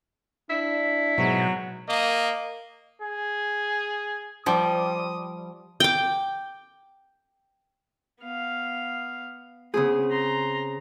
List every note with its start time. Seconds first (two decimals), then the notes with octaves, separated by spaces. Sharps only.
0.50 D4 E4
1.18 G#2 B2 F#3
1.88 A#3 D#5
3.02 G#4
4.46 F3 G3 D#6
5.80 G5 D6
8.20 B3 F5
9.74 C#3 B3 C4 G#4
10.12 A#5 C6